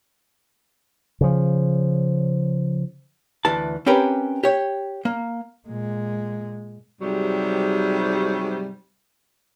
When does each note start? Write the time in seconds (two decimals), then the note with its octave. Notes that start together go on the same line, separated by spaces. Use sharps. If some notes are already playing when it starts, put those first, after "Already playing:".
1.21 C#3 F3
3.45 D2 E3 A5
3.86 C4 C#4 G4 A#4 B4
4.43 G4 C#5
5.05 A#3
5.68 A#2 G#3
7.01 G#2 C3 F#3 G3